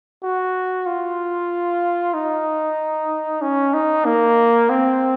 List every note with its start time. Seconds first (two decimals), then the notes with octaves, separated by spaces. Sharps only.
0.23 F#4
0.87 F4
2.14 D#4
3.42 C#4
3.74 D#4
4.05 A#3
4.70 C4